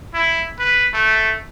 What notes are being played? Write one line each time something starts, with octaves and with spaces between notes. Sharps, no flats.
E4
B4
A3